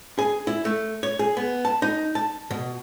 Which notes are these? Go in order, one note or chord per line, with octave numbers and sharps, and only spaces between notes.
G#4
E4
A3
C#5
G#4
B3
A5
D#4
A5
B2